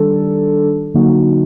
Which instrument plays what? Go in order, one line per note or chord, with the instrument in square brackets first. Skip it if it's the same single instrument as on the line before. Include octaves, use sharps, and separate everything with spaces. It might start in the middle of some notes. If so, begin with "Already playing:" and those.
Already playing: [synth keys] D#3 G3 D4 A4
D3 F#3 A#3 D#4 F#4